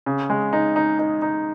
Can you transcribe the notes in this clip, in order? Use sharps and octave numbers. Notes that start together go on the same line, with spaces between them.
C#3
G#3
D#4
D#4
D#4
D#4